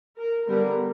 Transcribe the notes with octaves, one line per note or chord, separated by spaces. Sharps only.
A#4
D3 G3 B3 A#4